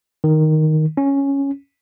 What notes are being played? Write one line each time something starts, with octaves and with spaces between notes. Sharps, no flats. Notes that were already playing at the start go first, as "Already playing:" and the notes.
D#3
C#4